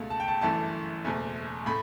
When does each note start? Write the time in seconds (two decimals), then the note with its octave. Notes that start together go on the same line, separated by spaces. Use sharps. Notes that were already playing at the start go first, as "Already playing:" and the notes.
Already playing: C#2 B2 A3
0.10 A5
0.20 G5
0.28 A5
0.41 G1 F#2 E3 A3 A5
1.05 F#1 E2 B2 A3
1.66 A2 A3 B5